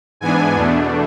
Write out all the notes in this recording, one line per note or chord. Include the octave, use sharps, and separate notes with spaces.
G#2 E3 B3 D4 G#5
E2 B2 A3 D4